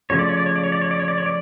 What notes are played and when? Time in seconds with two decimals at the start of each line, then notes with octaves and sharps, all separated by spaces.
0.10 C#3 F3 A3 C#5
0.19 D5
0.29 C#5
0.37 D5
0.46 C#5
0.56 D5
0.64 C#5
0.72 D5
0.81 C#5
0.91 D5
0.99 C#5
1.08 D5
1.18 C#5
1.26 D5